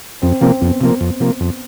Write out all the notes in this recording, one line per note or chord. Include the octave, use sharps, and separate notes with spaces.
F2 C4
C3 F3 A#3 C4
F2 B3
C3 F3 A#3
F2
C3 F3 A#3
F2